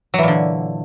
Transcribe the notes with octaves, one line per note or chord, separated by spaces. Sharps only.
A#2 D3 E3 F#3